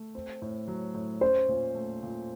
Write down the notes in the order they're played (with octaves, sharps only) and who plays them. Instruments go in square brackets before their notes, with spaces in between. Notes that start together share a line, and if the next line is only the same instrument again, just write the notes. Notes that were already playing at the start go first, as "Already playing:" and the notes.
Already playing: [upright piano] A3
C4
A2
F#3
A2
[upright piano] C#4 [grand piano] C5
[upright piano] A#2
A3
A#2